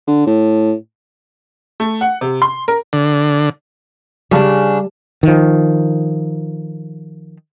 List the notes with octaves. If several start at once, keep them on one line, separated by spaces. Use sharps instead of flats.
D3
A2
A3
F#5
C3
C6
A#4
D3
C#3 G3 D4 A5
D#3 F3